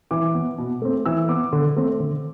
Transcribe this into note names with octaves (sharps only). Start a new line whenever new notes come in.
E3 D6
B3
B2
A3 C4
E3 E6
B3 D6
D3
A3 C4
D3